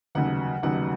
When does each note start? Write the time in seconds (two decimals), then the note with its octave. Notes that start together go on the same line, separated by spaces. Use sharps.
0.15 F1 D#2 C#3 F#3 F#5
0.63 F1 D#2 C#3 F#3 F#5